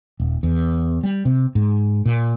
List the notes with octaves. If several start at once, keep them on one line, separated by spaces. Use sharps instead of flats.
D#1
E2
G3
C3
G#2
A#2